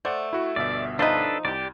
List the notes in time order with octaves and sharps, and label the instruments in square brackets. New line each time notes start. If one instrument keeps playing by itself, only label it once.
[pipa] A3 [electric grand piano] C5 D5 F#5
[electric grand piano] E4 F#4
[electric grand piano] G1 B2 E5 [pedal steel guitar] D5
[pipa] F3 D#4 [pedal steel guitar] D4 A4 B4
[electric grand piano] C2 [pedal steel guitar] G4 D5